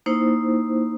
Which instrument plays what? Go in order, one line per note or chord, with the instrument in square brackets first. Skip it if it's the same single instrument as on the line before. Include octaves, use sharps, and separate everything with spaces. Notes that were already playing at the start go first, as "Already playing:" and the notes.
[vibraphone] A#3 D#4 E4 C5